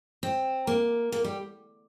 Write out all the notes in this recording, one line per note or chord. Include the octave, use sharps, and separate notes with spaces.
C4
A#3
A#3
G3